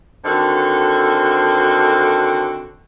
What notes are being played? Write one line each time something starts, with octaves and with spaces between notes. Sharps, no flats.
D3 D#3 C4 F#4 A4